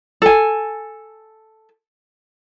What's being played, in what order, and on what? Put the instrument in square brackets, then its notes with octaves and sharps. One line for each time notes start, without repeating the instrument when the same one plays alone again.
[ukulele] A4 G#5